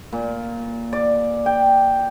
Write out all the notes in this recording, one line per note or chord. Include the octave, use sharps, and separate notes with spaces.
A#2
D5
G5